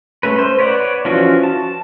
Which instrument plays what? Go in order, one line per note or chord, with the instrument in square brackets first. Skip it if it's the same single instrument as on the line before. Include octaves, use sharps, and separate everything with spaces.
[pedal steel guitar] A3 C#4 B4
C5
B4 C#5 D5 F#5
E3 F3 C#4 F4 F#4
A5